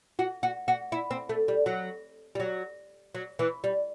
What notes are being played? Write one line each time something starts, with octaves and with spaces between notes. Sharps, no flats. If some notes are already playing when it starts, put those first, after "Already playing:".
F#4
F#4
F#4
E4
C4
A3
G3
F#3
G3
F#3
F#3
E3
G3